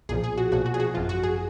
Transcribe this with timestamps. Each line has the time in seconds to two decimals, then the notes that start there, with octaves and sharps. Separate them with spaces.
0.09 B1 A#2 F3 G#4
0.24 G#4
0.37 F#4
0.52 B1 A#2 F3 F#4
0.66 F#4
0.74 G#4
0.80 F#4
0.94 G#1 F#2 F3 F4
1.09 F#4
1.23 G#4